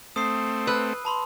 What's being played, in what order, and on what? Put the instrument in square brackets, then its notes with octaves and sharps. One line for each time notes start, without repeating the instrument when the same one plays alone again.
[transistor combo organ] A3 C4 [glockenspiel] D#6 C7
[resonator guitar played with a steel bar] B4 [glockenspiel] E6
[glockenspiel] A5 B5 C6